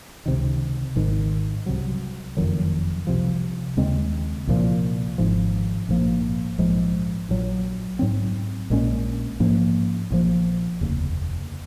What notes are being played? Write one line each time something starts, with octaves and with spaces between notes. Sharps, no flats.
C#2 C3 D#3
G#1 G#2 D#3 G#3
C2 C3 F#3
F#1 F2 D#3 F#3
C2 C3 F3
D#2 C#3 G#3 C4
C2 A#2 F3
G#1 G#2 F3
A#1 G#2 F3 A#3
A#1 G#2 F3 G#3
A#1 A#2 F#3
G#2 F#3 C4
A#1 A#2 G#3 C#4
G#2 F3 A#3 C#4
A#1 G#2 F3 A#3
F1 D#2 C#3